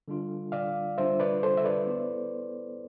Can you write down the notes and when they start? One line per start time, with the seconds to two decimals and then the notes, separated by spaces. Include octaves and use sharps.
0.08 D3 G3 D4 F4
0.52 D5 F5
0.98 D3 G3 D4 F4 C5 E5
1.20 B4 D5
1.43 A4 C5
1.57 E5
1.65 B4 D5
1.87 B3 E4 A4 C5